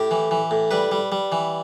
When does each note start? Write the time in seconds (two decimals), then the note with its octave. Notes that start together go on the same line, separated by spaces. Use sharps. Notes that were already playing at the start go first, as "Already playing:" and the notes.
Already playing: A2 G4
0.11 E3
0.31 E3
0.51 A2
0.71 G3 B4
0.92 G3
1.12 G3
1.32 E3